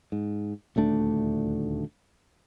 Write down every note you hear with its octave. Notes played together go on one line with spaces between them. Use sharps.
G#2
D#1 D2 A3 D4